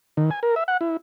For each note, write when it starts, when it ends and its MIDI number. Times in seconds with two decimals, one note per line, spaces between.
0.17 0.30 51
0.31 0.40 80
0.43 0.55 70
0.56 0.64 76
0.68 0.77 78
0.81 0.97 64